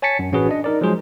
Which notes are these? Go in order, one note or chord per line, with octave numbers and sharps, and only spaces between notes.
C#5 G#5 A5 A6 B6 C#7
F#2
A1 C#4 F#4 G#4 B4
D4 D#5
D#4 A#4 D5
F3 F#3 G#3 G#4 C5